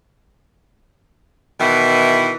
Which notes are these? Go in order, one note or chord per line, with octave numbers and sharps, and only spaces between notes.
B2 D#3 E3 E4